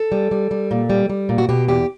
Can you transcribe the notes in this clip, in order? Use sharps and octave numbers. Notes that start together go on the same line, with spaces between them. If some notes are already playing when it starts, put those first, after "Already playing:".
Already playing: A4
G3
G3
G3
A#2
G3
G3
A#2
F#4
B2 G4
E2 G4